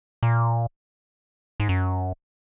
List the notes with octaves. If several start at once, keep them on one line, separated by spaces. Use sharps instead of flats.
A#2
G#2
F#2